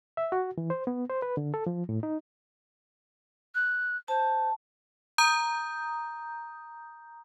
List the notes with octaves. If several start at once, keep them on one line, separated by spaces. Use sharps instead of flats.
E5
F#4
E3
C5
B3
C5
B4
D3
A4
F3
A2
D#4
F#6
C5 A5
A#5 D#6 G6